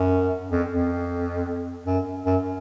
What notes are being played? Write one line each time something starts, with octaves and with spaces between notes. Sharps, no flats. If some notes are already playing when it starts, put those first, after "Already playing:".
Already playing: F#2
F2
F2
F#2
F#2